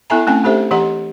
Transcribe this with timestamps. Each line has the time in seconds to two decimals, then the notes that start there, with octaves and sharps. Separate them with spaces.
0.10 B3 E4 A4 E5 G#5 A#5
0.27 A3 C4 C#4 G5 G#5
0.44 A3 D4 G4 A4 C5 E5
0.71 E3 G4 D#5 F#5 A#5